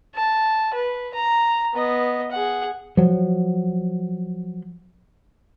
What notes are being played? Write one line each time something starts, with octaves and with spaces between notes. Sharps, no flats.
A5
B4
A#5
B3 D#5
G#4 F#5
F3 F#3